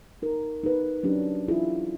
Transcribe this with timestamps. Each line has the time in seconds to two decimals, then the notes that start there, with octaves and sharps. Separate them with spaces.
0.22 D#4 A#4
0.64 D#4 G#4 B4
1.03 F#3 C#4 D4 G4
1.48 E4 F4 G#4